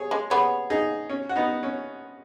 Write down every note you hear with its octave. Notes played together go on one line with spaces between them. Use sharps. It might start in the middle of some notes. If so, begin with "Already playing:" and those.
Already playing: G#4 C#5
G#3
B3 G#4 C#5
D#4 G#4
C#4
F#4
B3 D#4
C#4